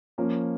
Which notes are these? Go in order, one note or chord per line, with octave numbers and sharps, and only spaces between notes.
F3 A#3 C#4